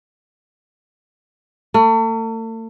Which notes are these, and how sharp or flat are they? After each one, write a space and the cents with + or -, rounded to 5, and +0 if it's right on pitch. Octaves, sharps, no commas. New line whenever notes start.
A3 +40